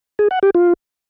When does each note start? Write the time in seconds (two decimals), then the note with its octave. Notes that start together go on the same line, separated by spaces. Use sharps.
0.19 G#4
0.31 F#5
0.43 G4
0.55 F4